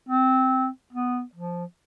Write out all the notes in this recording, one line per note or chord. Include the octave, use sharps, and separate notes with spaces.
C4
B3
F3